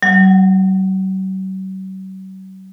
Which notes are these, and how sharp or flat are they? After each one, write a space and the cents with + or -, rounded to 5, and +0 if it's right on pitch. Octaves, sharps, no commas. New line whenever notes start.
F#3 +45 F#5 -20